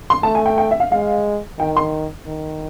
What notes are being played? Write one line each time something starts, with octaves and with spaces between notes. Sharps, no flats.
C6
A3 A5
G#5
G5
G5
E5
F5
G#3 F5
D#3 G5
C6
D#3